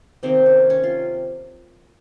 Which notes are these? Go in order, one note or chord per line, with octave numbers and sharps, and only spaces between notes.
C3 D#3 A#3 C4
C#4
C#4
F4